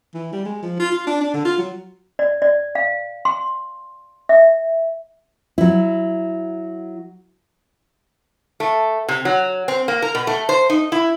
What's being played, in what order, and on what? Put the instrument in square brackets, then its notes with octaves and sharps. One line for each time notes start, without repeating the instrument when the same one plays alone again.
[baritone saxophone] E3
G3
G#3
F3
F4
F4
D4
D4
D3
F4
F#3
[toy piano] D5
D5
F5
C6
E5
[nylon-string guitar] F#3 E4
[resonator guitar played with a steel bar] A3
C3
F#3
C4
A#3
A#4
B2
A3
C5
D#4
E4